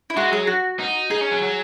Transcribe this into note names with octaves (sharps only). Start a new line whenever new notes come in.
E4
G#3 F#4
F#3 G#4
F#4
D#4
D#4 G#4
C#4
F#3
F#3